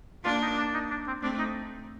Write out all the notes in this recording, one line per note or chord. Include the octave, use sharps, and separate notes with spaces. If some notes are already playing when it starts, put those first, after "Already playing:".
A#3 D4 F4
D#4
D4
D#4
D4
C4
A3 C4 D4
D#4